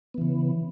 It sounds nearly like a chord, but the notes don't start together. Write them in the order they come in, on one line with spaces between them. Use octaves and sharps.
B3 E3 C#3